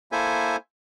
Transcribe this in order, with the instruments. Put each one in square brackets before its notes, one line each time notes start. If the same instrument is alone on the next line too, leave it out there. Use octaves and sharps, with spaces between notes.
[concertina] A#3 E4 A4 C5 E5 G#5